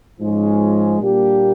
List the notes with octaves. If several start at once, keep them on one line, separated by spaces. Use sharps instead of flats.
G#2 F3 G#3 C#4
A#2 G3 A#3 D4 G4